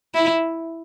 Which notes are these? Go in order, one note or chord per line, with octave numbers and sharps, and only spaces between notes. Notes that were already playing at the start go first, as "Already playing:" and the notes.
E4